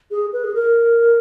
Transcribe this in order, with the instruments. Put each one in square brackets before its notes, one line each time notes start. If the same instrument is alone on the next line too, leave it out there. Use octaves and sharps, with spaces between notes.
[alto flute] G#4
B4
G#4
A#4